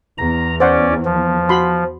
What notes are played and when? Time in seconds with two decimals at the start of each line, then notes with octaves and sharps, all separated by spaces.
0.18 E2 A#5
0.60 C#4 C5 D5 F#5
1.05 F3
1.49 F#4 B5 C6